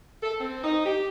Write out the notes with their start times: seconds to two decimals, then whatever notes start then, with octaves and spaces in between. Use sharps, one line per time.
0.23 A4
0.40 C4
0.64 D#4
0.86 G4